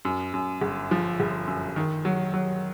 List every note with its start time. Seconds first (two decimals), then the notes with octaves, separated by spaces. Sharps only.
0.05 F#2
0.34 F#2
0.61 G1
0.91 F3
1.20 G1
1.47 F#2
1.76 D#3
2.05 F#3
2.34 F#3